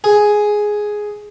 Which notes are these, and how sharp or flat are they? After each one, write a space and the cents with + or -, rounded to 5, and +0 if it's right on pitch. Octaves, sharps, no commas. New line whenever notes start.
G#4 +5